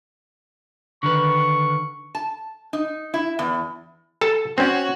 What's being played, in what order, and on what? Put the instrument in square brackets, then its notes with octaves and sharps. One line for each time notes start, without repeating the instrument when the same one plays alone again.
[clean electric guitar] D3 D#3 B4 [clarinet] C#6
[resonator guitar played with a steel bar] A5
D#4
E4
E2
[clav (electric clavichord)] A4 A5
[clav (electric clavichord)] C4 C#4 [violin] F#4 C#5